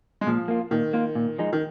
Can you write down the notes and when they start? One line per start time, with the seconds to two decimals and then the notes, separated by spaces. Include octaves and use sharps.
0.21 G#3
0.27 A#2 F3
0.48 A#3 F4
0.71 A#2 D#3
0.93 A#3 F4
1.15 A#2
1.38 F3 G#3 D#4
1.53 D#3